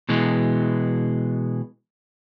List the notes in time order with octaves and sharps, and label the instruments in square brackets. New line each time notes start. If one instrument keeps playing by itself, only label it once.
[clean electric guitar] B2 E3 G#3